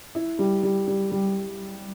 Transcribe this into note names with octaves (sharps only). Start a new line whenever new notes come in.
E4
G3
G3
G3
G3